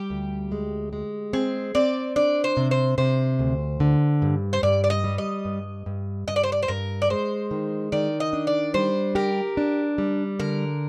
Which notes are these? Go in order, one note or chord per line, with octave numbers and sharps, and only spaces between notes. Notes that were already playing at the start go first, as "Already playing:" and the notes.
Already playing: G3 G4
D2
G#3
G#3
C4 G#4
C4 D5
D4 D5
C5
C3
C5
C3 C5
D2
D3
G2
C5
G2 D5
D5
D#5
G3
D#5
G2
G2
G2 D#5
D5
C5
D5
C5
G2 A#4
D5
G#3 C5
D#3
D#3 D5
D#5
D4
D5
G3 C5
G4 A#4
D4
G3
D3 A#4